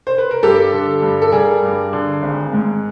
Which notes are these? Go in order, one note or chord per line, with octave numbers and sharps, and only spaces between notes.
C5
B4
A#4
G2 G4 A4
D3
G2
A4
G3 G#4 A#4
G2
D3
G#1
G#2